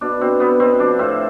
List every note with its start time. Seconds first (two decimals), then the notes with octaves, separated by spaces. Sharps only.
0.01 B2 D4
0.21 B2 C4
0.40 B2 B3
0.60 B2 C4
0.79 F3 D4
0.99 A2 C4